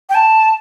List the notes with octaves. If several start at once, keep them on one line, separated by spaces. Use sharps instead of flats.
G5
A5